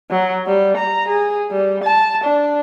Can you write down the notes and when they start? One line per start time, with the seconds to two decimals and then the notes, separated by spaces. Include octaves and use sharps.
0.10 F#3
0.46 G3
0.77 A#5
1.08 G#4
1.51 G3
1.83 A5
2.24 D4